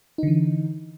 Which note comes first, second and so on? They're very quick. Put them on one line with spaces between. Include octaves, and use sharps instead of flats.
D#4 D3 E3